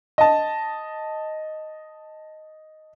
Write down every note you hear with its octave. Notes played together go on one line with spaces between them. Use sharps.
D#5 A5